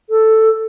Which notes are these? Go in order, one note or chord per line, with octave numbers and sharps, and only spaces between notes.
A4